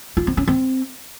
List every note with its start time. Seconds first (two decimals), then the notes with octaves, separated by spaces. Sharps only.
0.17 F4
0.27 C4
0.37 C#4
0.47 C4